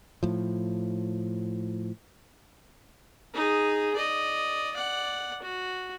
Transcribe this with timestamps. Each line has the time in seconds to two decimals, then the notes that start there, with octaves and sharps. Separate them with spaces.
0.23 A2 F3
3.34 D#4 G#4
3.95 D5 D#5
4.74 D5 F#5
5.42 F#4